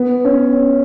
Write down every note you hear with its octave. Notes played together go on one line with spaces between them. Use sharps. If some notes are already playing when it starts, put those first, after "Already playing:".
Already playing: B3
C#4